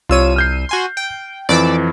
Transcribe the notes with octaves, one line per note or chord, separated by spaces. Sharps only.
C2 F4 C#5 E6 D#7
F6 G6 C7
F#4 G#5 C6
G5
F2 E3 D5 D6 E6